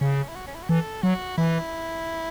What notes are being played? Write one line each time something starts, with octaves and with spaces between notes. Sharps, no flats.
C#3 C#4
E4
F#4
C#4
E4
F#4
E3 A4
F#3 F#4
E3 E4